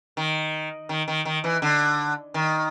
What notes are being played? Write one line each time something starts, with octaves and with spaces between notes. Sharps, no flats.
D#3
D#3
D#3
D#3
E3
D3
D#3